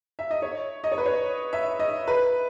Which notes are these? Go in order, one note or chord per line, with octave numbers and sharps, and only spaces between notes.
E5
D#5
C#5
D#5
C#5
B4
C#5
E5
D#5
B4